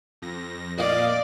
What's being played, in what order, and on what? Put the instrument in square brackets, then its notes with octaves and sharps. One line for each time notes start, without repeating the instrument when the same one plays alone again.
[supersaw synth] F2 A#6
[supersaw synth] A#2 D#5 F5 [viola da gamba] D5